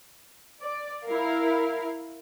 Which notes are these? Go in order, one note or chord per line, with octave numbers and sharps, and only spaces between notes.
D5
E4 A#4 F5